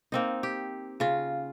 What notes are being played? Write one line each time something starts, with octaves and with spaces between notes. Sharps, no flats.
A#3 C4 D#4
G4
C#3 F4